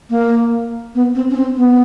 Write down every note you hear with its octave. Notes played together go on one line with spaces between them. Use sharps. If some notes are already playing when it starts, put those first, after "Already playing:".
A#3
B3
C4
C#4
C4
B3